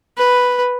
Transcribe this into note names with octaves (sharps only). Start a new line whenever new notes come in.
B4